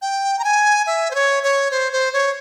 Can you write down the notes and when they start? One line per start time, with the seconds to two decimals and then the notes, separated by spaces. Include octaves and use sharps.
0.02 G5
0.39 A#5
0.44 G#5
0.87 E5
1.11 C5
1.15 C#5
1.43 C#5
1.71 C5
1.93 C5
2.13 C#5